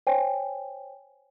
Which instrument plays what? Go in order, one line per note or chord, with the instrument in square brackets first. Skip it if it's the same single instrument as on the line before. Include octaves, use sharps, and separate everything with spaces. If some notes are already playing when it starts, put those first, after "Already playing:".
[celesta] C5 C#5 G5 G#5